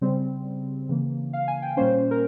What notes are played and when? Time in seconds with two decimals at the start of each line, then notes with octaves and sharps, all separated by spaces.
0.01 C#3 G3 C4
0.89 C#3 E3 A#3
1.33 F5
1.48 G#5
1.62 G5
1.77 A#2 G3 A#3 C#4 C5
2.11 A#4